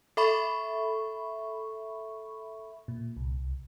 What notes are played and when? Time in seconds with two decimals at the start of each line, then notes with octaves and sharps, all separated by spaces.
0.17 A4 E5 B5 C#6
2.88 A#2
3.17 C2